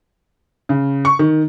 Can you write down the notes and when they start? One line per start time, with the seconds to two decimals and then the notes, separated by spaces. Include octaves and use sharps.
0.69 C#3
1.05 C#6
1.19 D#3